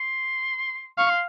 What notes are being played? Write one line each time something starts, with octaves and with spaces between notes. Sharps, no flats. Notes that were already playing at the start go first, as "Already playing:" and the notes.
Already playing: C6
F5 C#6
C6